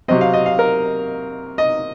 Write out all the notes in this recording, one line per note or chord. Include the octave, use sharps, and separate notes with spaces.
C3 F#3 C4 D#5
F5
D#5
F5
A#4
D#5